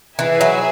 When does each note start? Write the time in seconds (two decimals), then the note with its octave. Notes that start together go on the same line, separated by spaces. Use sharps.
0.19 E3 G#4 B4 E5 G#5
0.41 F#3